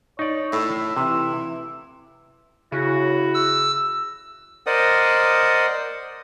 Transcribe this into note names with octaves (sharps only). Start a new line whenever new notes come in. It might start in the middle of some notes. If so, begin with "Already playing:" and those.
D#4 C#5 D5
A2 E5
C3 E3
C#3 E4 F#4
E6
A#4 C5 D5 D#5 F#5 D#6